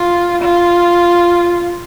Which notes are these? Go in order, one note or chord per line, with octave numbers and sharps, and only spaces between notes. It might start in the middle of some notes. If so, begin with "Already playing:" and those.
Already playing: F4
F4